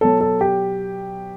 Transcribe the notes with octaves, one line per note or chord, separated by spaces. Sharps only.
B2 F#3 A4
A4
G4